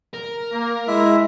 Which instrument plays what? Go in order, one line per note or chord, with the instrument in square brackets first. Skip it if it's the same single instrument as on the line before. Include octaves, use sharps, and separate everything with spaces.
[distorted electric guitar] A#4
[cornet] A#3
[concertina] G#3 E5 [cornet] E4